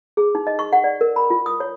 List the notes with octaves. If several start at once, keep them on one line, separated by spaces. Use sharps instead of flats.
G#4
D#4
D#5
C#6
F#5
D5
A#4
B5
F4
D#6
C#5